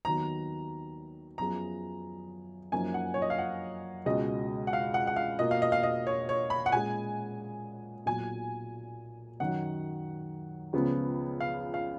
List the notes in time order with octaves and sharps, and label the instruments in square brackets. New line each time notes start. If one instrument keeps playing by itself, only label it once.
[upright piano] D#2 D#3 F#3 B3 [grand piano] A#5
[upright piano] F#2 F3 B3 F4 G#4 [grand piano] A#5
[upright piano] F#2 F3 A#3 D#4 [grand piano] G#5
[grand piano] F#5
C#5
D#5
F5
F#5
[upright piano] C#2 B2 G#3 [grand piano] D#5
[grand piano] F#5
F5
F#5
F#5
F5
[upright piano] B2 A#3 F4 [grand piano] D#5
[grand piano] F5
D#5
F5
D#5
C#5
C#5
B5
F#5
[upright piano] A#2 G#3 C#4 G#4 [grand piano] G#5
[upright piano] B1 A#2 F#3 [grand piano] G#5
[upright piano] F#2 D#3 F#3 [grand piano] F#5
[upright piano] C#2 C#3 F3 B3
[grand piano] F5
F5